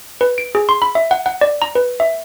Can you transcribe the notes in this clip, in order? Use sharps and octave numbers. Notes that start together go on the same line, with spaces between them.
B4
D7
G#4
C6
B5
E5
F#5
F#5
D5
A#5
B4
E5